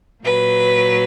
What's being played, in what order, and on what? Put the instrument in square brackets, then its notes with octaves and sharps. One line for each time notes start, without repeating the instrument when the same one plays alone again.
[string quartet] A#2 F#3 B4